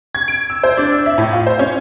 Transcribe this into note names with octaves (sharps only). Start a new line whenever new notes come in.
G#6
D7
E6
C5
D4
E6
E5
A2
F4
C5
C#4